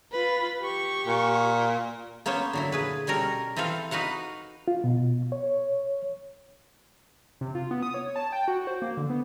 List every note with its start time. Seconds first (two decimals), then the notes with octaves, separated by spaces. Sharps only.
0.12 F4 B4
0.61 G4 C#6
1.07 A#2
2.26 A#3 B3 C#4 C5 C#5
2.53 D3 F#3 E4
2.72 A#2 G#4 B4
3.07 B2 G3 C#4 A4 A#4 A#5
3.56 E3 C4 F4 A4 F5
3.91 D#4 F#4 B4 F5 F#5
4.68 F4
4.84 B2
5.32 C#5
7.41 C3
7.55 F4
7.71 B3
7.83 D#6
7.94 C#5
8.16 A5
8.32 G5
8.48 F#4
8.67 C5
8.82 A#3
8.97 D3
9.10 B3